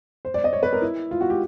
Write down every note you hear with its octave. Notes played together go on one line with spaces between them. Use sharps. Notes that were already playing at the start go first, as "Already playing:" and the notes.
C5
D5
D#5
C#5
B4
A#4
E4
F4
F#4
G4